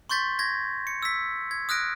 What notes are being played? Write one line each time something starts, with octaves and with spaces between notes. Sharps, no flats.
C6 C#6 G6 A6 B6
G#6 A#6
C#7
E6 B6
G#6
D#6 F6 F#6 A#6 D7